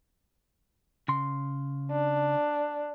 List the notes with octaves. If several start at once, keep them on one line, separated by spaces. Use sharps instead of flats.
C#3 C6
D4